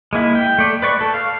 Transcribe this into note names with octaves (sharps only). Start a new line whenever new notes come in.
G#3 A#3 E4
G5
A3 D5
B4 D5 C#6
A4
F5